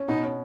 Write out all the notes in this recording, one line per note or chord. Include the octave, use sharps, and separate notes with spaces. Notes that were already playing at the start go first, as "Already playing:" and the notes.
Already playing: C#4
B2 D#4
C#4